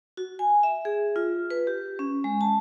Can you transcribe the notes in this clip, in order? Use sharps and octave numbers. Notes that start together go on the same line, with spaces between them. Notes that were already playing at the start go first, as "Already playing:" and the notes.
F#4
G#5
E5
G#4
F4
B4
G4
C#4
G#3
A5